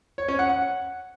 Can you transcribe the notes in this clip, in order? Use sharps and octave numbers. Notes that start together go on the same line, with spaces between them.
C#5
C#4
F#5
F#5